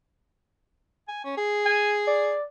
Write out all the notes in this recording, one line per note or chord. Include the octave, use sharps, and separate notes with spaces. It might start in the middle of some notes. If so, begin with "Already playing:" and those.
G#5
C#4
G#4
G#5
D5